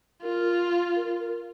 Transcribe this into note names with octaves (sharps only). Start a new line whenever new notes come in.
F4 A#4
A#4
A#4